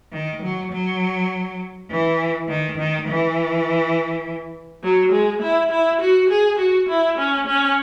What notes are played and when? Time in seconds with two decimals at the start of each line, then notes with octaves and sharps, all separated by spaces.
0.12 D#3
0.42 F#3
0.71 F#3
1.89 E3
2.48 D#3
2.77 D#3
3.06 E3
4.82 F#3
5.11 G#3
5.41 E4
5.70 E4
6.00 F#4
6.29 G#4
6.58 F#4
6.88 E4
7.17 C#4
7.46 C#4